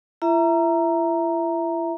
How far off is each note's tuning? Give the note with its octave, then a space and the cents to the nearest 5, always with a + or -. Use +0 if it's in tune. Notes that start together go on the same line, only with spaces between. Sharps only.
E4 +40 E5 +0 A#5 +0